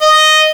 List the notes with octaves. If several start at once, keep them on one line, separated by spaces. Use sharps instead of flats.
D#5